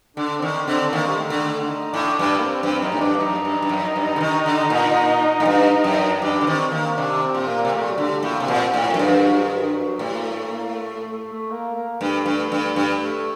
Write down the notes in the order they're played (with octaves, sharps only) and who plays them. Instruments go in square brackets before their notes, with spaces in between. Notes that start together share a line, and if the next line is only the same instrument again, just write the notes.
[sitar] D3 [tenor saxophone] D4
[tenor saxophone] C4
[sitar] D#3 [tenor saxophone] D4
[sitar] D3 [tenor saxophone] C4
[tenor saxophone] C4
[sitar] D#3 [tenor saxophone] A#3
[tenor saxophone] G3
A3
[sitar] D3
[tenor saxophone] A3
D4
D#4
[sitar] A2 [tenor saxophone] D4
[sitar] G2 [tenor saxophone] D4
[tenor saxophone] A#3
C4
[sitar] G2 [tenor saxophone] C4
[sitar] F#2 [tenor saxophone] D#4
[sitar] A2
[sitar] G2 [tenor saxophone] D4
[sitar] F#2 [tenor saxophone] D#4
[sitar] G2
G2
F#2
G2
D3
D#3
D3
A#2
A2
G2
F#2
[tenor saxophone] D#4
[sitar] G2 [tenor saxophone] D4
[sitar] D3
[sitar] D#3 [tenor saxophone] C4
[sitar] D#3 [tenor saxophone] A#3
[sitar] C3 [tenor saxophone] D4
[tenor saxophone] C4
[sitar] A#2
[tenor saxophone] A#3
[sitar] C3
[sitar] A#2 [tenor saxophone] A3
[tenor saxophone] F#3
[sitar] D3 [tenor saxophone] G3
[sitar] A2 [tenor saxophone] A#3
[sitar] C3
[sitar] A#2 [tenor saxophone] C4
[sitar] A2 [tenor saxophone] D#3
[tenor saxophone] F#3
[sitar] F#2
[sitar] G2 [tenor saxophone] D#3
[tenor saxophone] D#3
F#3
D#3
F#3
D#3
F#3
[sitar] A2 [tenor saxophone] G3
[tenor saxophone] A#3
A3
A#3
A3
A3
A3
A3
A#3
A#3
[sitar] G2 [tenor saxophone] A3
[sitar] G2
G2
G2
[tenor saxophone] A3